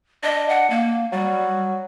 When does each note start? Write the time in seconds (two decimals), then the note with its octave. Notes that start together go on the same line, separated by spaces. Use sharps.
0.23 D4 D#5
0.49 F#5
0.70 A#3
1.12 F#3 G3